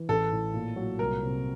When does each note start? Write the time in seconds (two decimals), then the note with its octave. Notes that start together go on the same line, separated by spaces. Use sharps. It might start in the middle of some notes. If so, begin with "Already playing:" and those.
Already playing: E3
0.09 A1 A4
0.32 A2
0.54 A#2
0.76 F#3
0.99 C2 A#4
1.23 C3